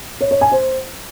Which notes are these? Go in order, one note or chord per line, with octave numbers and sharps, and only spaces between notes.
C#5
C#5
G#5
C5